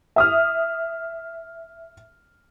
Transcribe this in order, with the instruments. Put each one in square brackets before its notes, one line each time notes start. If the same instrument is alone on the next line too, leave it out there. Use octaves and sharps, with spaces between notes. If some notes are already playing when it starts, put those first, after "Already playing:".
[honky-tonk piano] E5 D#6 F6